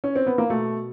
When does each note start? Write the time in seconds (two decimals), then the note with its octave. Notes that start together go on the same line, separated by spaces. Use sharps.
0.04 C#4
0.16 C4
0.26 B3
0.38 A#3
0.50 B2 A3